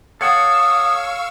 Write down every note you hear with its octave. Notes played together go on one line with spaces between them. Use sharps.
A4 C#5 F5 F#5 C#6 D#6 E6